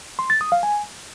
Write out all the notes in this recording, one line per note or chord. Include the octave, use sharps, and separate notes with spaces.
C6
A6
D#6
F5
G#5